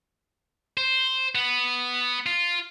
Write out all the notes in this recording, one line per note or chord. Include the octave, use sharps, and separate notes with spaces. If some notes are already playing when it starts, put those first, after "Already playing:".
C5
B3
F4